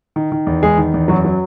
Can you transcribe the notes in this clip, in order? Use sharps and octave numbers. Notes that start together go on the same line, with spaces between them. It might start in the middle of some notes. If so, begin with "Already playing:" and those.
D#3
D#3
E2
E2 G#3 G#4
D#3
E2
F#2 F#3 F#4
F#3